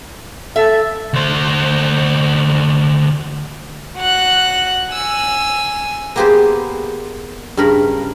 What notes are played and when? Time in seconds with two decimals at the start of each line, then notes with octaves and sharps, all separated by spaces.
0.56 A4 E5
1.13 D2 C5
3.98 F#4 F#6
4.93 G#5 E6
6.16 A#3 B3 G4 G#4 B4 C5
7.57 G2 C#3 A#4 B5